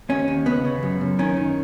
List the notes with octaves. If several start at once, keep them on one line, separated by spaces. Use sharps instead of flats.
D#2 C#4
D#2
C#3 B3
C#3
F#2
F#2
D#3 C#4
D#3